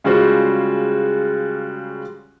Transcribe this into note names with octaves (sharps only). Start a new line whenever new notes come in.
C#3 G3 G#3 F4 F#4 C5